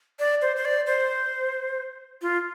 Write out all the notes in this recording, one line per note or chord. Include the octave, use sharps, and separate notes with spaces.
D5
C5
C5
D5
C5
F4